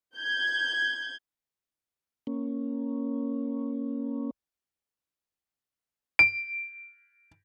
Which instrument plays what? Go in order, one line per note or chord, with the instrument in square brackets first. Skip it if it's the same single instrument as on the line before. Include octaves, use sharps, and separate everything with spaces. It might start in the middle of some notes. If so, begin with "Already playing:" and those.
[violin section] G6 G#6
[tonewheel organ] A#3 C#4
[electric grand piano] D7